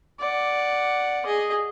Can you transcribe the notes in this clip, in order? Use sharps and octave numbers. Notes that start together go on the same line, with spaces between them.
D5 F#5
G#4 D#5